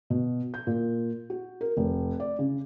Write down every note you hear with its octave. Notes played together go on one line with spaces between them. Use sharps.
B2
G6
A#2
F#4
A#4
F1
D5
C#3